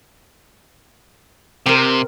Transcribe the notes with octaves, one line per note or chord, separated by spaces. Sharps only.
C3 C4 A#4